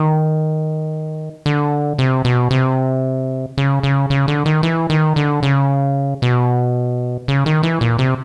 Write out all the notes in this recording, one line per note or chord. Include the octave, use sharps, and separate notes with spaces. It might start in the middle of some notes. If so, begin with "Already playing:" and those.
Already playing: D#3
D3
C3
B2
C3
C#3
C#3
C#3
D3
D#3
E3
D#3
D3
C#3
B2
C#3
D#3
E3
A#2
C3